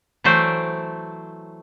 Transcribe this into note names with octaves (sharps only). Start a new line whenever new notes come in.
E3 F#3 A3 C5 D5